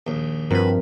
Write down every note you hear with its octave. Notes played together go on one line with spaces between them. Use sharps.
A#1 D#2
G2 F3 C4 F#4 A#4 B4